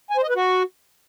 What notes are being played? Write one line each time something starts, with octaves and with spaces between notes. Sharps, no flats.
G#5
C5
D#5
B4
F#4